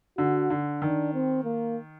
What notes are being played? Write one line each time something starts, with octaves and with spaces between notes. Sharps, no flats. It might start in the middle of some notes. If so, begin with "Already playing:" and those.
D3 F#4
D3
D#3 D4
C4
A#3